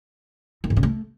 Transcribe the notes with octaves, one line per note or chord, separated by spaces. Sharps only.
D#3
G#2
C#3
A3